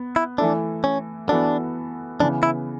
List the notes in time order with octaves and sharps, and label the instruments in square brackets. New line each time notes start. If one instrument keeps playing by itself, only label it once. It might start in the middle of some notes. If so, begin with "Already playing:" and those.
Already playing: [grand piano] B3
[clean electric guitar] E4
[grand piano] E3 A3 E4 A4 [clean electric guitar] D4
[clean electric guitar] C#4
[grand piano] E3 B3 F#4 A4 [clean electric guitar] D4
[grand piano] C#3 E3 B3 [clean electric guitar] D4
[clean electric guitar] E4